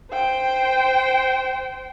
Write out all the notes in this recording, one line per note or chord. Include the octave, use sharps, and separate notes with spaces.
C5 G5